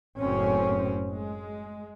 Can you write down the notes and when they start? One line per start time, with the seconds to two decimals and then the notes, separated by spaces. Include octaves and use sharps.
0.19 F#1 F#2 A2 C4 C#4
1.10 G#3